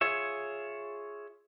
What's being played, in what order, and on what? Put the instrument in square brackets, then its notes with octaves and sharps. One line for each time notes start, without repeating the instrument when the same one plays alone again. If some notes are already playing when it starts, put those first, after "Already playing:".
[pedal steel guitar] F4 G#4 C#5 E5